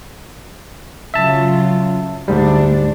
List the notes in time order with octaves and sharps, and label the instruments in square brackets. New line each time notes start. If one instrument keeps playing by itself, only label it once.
[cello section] C#3 F#3 F4 [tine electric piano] E5 A5
[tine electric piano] D2 G#2 G3 [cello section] A3 D4